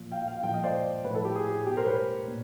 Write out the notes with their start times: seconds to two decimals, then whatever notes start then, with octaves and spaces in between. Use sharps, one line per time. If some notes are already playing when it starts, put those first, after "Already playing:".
Already playing: A#2 F3
0.12 F5 G5
0.28 F5 G5
0.43 A#2 F3 F5 G5
0.53 D#5 F5
0.63 C5 D5
1.04 A2 F3 B4 C#5
1.15 A4 B4
1.25 G4
1.35 G#4
1.50 G#4
1.66 B2 G4
1.77 A#4 C5
1.87 B4 C#5
2.28 A#2